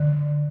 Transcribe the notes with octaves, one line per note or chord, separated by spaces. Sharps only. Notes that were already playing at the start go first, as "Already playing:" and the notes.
Already playing: D3